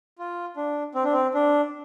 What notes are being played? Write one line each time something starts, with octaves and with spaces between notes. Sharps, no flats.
F4
D4
C4
D4
C4
D4